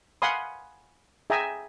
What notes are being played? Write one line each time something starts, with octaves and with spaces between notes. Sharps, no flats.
F5 F#5 G#5 B5 C6 D#6
G#4 E5 G5 G#5 A#5 D#6